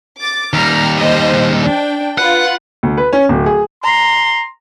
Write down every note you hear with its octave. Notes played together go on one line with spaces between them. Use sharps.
D6 A6
D#2 G3 A#5 F6
C5 D#5
D4 G5
F4 B4 F#5
D2
B4
C#4
D1
G#4
A#5 C6